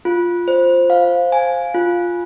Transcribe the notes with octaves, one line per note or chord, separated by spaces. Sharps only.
F4
C5
F5
G#5
F4